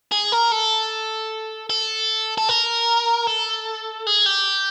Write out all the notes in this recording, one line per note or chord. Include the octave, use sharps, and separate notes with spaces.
G#4
A#4
A4
A4
A4
A#4
A4
G#4
G4